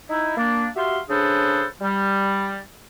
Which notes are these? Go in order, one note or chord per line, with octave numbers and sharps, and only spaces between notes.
D#4 E4
A#3 D4
F#4 G4 E5 F5 C6
C#3 D4 G#4 A4 B4 C5
G3